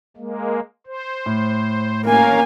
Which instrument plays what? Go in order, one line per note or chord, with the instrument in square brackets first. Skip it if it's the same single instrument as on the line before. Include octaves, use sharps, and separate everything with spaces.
[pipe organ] G#3 A#3
C5
[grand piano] A2
[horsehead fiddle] A#3 G#5 [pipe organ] C#4 A#4 F5